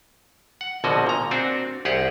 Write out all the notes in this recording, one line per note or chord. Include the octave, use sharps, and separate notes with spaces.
F#5
A#1 B2 D3 F3 F#4 D#5
A#2 A#5
C4 D4 F#4
C2 G4 G#4 F#5